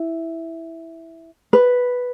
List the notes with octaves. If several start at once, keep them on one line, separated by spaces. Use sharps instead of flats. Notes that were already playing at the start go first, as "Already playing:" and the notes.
Already playing: E4
B4